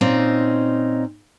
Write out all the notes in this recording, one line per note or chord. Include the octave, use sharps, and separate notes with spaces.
A#2 C4 C#4 D#4